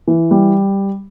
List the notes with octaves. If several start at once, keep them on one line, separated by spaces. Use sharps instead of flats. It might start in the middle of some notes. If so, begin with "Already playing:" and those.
E3
G3